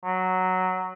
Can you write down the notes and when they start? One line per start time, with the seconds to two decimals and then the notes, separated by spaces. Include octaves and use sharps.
0.04 F#3